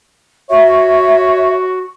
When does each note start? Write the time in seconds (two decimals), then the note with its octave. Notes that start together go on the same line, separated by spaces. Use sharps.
0.50 F#4 C#5 E5